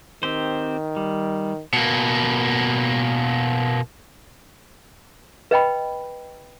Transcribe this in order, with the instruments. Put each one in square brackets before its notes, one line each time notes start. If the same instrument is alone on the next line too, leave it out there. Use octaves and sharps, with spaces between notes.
[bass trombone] D#3 [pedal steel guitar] C4 G4 C5
[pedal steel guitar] G3
[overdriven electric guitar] B2 A#3
[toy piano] B4 D#5 G5 B5